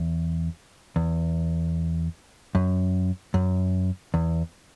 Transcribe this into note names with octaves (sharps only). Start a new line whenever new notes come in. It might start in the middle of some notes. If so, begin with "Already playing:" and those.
Already playing: E2
E2
F#2
F#2
E2